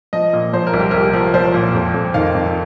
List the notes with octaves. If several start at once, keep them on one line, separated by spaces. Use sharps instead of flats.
F3 D#5
A#2
F3 C5
A#4
C2
G4
C2 A#4
G4
F3
F3 C5
A#2
F2
F2
D#3 F5
F2